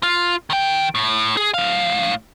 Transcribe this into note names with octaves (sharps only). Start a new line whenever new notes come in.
F4
D#3 G5
A2
G#4
A2 F5